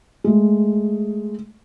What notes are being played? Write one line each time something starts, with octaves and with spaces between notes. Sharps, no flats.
G#3 A3